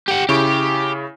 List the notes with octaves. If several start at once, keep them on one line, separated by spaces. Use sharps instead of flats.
G4 F#5
C#3 E4 G4 C#6